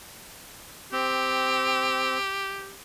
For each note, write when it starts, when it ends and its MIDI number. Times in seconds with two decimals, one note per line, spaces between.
0.92 2.18 60
0.92 2.74 67